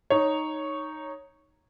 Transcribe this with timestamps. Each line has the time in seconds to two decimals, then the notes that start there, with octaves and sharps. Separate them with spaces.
0.10 D#4 C#5